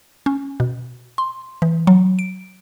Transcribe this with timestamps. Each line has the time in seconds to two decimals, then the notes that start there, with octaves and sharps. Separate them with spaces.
0.26 C#4
0.60 B2
1.18 C6
1.62 E3
1.87 F#3
2.19 D7